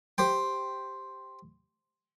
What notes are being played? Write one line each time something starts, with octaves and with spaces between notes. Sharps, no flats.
G4 C5 G5